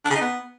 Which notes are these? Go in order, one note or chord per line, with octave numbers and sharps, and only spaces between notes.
D4
C#3
D#4
B3